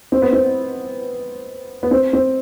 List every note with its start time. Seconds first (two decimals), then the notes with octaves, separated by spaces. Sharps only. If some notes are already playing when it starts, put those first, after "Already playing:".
0.12 C4
0.22 B3
0.33 C4
1.83 B3
1.91 C4
2.13 C4